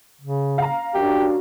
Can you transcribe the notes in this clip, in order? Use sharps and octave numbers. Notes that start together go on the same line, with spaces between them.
C#3
F5 A#5
F#2 D4 G4